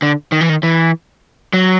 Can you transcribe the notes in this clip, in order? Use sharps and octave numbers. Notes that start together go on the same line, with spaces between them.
D3
D#3
E3
D#3
E3
F#3